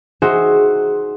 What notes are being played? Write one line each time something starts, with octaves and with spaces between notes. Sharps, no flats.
D#4 F#4 G#4 C5 E5